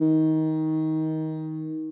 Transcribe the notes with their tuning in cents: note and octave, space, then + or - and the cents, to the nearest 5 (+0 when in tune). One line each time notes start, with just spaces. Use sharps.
D#3 +20